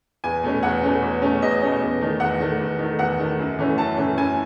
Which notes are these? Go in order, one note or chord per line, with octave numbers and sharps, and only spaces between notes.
E2 G#5
B2 A3 C#4
E2 F#5
B2 A3 C#4
E2
B2 A3 C#4
E2 D#5
B2 A3 C#4
E2
D#3 A3
E2 F#5
D#3 A3
E2
D#3 A3
E2 F#5
D#3 A3
F#2
E3 A3 C#4
F#2 A5
E3 A3 C#4
F#2 G#5